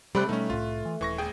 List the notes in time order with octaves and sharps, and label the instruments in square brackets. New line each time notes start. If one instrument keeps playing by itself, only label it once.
[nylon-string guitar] C3 G3 C4 [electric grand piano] A3 B5 F#6
[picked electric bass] B2 G3 [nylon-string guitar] A3 [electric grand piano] C#4 D#4
[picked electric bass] C2 A2 [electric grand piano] F4
[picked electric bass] E3
[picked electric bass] D#1 [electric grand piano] E3 C#6 A#6
[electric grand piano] G1 G#4 G5